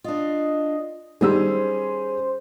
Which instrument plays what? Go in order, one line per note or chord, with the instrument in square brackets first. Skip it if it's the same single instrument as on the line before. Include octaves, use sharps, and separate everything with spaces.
[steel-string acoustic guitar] D4 F4 [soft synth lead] D#5
[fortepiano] D#3 G3 E6 [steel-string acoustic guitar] C#4 G#4 [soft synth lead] C5